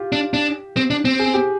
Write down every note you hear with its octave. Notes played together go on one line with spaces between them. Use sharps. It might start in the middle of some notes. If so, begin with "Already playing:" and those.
Already playing: F4 G4
D4
D4
C4
D4
C4
G#4
G4